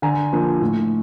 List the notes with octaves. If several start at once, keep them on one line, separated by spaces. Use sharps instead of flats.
D3 G#5 A#5
F3 A#3 D4
A2